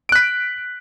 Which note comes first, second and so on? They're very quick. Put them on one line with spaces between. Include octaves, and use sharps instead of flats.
D7 F#6 B6